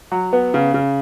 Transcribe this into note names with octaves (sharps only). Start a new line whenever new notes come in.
F#3
B3
C#3
C#3